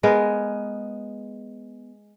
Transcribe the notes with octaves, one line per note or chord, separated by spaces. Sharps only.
G#3 B3 G#4 A#4